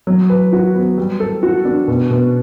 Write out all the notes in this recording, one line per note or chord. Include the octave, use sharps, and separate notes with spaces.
F#3
B4
F#4
B3
G3
A4
F#4
D4
B2
B2